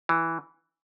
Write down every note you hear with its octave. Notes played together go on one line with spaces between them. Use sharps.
E3